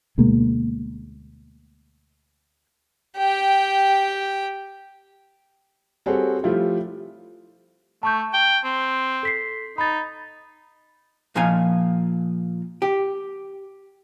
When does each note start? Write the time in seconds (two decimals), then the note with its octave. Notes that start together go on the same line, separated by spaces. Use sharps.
0.18 D2 B2 G#3 A#3
3.17 G4 G5
6.06 G3 C4 F#4 G#4 A4 C#5
6.43 F3 G3 A3 E4 F4 G4
8.03 A3 A5 C#6 G6
8.34 G5
8.65 C4
9.23 A4 B6 C7
9.78 D#4 B5 A6
11.35 A#2 F3 D#4 F5 G#5
12.82 G4